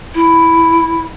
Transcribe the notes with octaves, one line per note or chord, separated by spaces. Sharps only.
E4